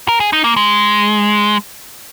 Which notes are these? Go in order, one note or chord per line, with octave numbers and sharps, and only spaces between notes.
A#4
G#4
D#4
A#3
G#3